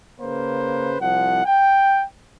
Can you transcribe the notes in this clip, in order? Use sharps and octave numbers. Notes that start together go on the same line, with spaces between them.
C#3 A#3 B4 C5
C2 F3 F#5
G5